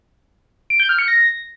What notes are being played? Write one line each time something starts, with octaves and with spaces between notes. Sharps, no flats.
D7
G6
F6
C#7
A#6